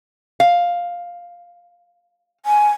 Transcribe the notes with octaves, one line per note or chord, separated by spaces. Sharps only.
F5
G#5